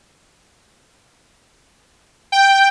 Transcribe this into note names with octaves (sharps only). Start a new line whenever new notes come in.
G5